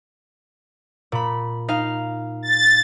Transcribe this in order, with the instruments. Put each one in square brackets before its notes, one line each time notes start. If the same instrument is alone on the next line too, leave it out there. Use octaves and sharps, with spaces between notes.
[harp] A#2 B5
D#4 F5
[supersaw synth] A6